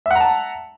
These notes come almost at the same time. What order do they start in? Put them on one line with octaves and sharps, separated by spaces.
E5 F#5 A#5 A5